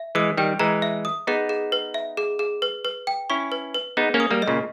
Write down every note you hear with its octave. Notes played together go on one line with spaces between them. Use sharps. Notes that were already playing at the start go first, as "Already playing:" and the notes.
Already playing: E5
E3 G#3 D#6
D#3 G3 G5
E3 G#3 A#5
E5
D#6
B3 D#4 G#4
G#4
B4
E5
G#4
G#4
B4
B4
G5
C#4 E4 C#6
B4
B4
B3 D#4 G#4
A#3 C#4
D#6
G3 A#3
D#5
A#2 C#3